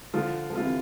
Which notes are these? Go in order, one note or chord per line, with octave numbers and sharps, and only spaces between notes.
D3 F3 F4
F3
C3 E3 F4